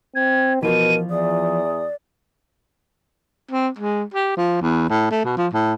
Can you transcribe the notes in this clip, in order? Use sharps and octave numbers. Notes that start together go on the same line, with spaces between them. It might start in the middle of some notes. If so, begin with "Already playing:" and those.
C4 G#6
B2 E3 F3 F4 A#4 D#7
E2 D5 D#6
C4
G#3
G4
F3
E2
A2
A3
B2
F3
A2